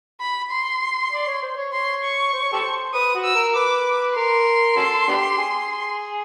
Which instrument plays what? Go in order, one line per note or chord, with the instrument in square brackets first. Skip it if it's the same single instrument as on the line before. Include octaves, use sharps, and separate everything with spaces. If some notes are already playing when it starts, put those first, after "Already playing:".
[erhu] B5
C6
[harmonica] D5
C#5
C5
C#5
[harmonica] C#5 [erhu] C6
[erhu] C#6
[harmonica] C5
C#5
G4 A4 C5
[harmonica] B4 [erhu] D#6
[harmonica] F#4
[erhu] E6
[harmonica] A#4
[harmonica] B4 [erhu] D6
[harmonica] A#4 [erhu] C6
[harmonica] C#4 F#4 A4
B3 D4 G4
G#4